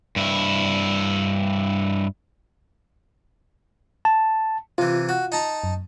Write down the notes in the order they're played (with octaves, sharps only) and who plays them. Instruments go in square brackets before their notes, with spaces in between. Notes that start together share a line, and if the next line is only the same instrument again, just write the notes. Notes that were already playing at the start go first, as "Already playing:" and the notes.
[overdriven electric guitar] G2 E4
[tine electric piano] A5
[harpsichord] C3 E3 [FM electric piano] F4
[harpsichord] F#4
D#4 A5 A#5
[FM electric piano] F#2